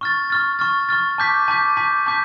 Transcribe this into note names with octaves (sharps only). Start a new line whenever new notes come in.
C#6 F6 A6
C#6 F6 A6
C#6 F6 A6
C#6 F6 A6
A5 D6 G6 B6
A5 D6 G6 B6
A5 D6 G6 B6
A5 D6 G6 B6